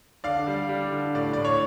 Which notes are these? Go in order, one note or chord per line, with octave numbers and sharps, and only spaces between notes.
D3 D5 F5
G3
G3
D3
A2 D5
A2 D5
C#5